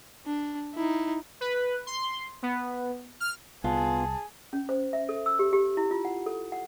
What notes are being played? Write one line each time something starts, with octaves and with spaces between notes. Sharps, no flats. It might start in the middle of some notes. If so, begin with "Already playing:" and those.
D4
D#4 E4
B4
C6
B3
F6
C2 B3 F4 G#4 A5
C#4
C5
E5
A4
E6
G4
G4
E4
F4
F#5
A4
F#5